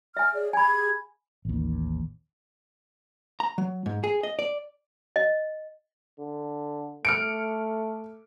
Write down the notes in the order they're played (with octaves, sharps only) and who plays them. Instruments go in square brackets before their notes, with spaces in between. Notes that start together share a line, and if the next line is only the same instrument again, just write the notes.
[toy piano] E5 G#5 [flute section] F6
[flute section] G#4 C#5 D5
[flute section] G4 G#4 G#6 [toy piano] G#5 B5
[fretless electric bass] A1 D#2
[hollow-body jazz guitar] A#5
F#3
G#2
G#4
D#5
D5
[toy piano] D#5
[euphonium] D3
[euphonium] A3 [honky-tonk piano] F6 C#7 D7